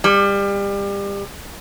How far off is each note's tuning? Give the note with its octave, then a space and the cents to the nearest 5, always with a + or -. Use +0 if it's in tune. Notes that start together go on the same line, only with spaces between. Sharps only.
G3 +30